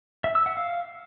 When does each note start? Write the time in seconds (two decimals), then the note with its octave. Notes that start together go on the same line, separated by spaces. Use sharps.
0.24 E5
0.35 E6
0.46 F#5
0.57 F5